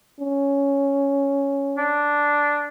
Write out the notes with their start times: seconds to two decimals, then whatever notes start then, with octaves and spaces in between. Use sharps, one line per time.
0.20 C#4
1.77 D4